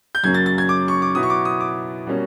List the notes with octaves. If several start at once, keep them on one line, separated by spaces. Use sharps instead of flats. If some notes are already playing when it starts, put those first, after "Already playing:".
G6
F#2 C#3 F#3 A#3 G#6
A6
A6
G#6
D6
C#6
D6
B2 F#3 B3 E4 D#6
C#6
D6
D#6
D6
B2 G3 A#3 C#4